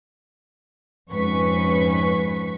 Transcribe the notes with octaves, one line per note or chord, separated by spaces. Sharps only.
F2 G#2 C#4 B4 C#6 B6